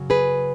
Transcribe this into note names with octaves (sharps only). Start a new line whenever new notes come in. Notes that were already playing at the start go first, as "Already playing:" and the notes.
Already playing: F#2 C#3 F#3
G#4 B4